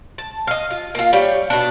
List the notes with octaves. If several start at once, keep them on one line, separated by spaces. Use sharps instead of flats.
A5
D#5 F5
F4
A#3 F4
G3 C#5 G5
B2 D4